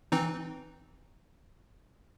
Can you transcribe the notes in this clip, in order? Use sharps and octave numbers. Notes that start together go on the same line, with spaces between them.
E3 C4 D#4